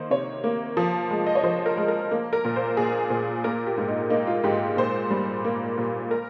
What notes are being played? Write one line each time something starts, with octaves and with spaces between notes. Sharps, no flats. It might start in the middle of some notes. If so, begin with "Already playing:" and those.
Already playing: D#3 A#3 C5
C3 C#5
A#3
F3
G#3
D#5
C#5
F3 C5
A#4
G#3
A#4
A#3
A#4
A#2
C5
A#2 G#4
A#2
A#3 A#4
G4
G#2
D#4
A#3 D#4
F4
G#2 G4
A#2 C5
G3
A#3
A#2
A#4